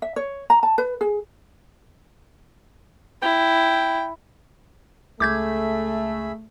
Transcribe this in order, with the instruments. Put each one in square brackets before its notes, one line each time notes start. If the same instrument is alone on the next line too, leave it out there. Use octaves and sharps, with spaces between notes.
[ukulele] E5
C#5
A#5
A5
B4
G#4
[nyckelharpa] E4 [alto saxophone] G5
[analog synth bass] C#2 [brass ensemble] A3 [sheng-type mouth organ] G#4 E5 B5 [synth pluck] D6 G6 G#6